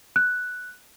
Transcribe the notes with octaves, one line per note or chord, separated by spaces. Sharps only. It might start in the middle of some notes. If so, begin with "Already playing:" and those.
F#6